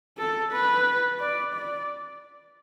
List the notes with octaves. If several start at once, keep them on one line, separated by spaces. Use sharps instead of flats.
A4
B4
D5
D5